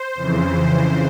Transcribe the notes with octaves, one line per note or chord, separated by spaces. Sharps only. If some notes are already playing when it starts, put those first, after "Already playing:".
Already playing: C5
F2 C#3 E3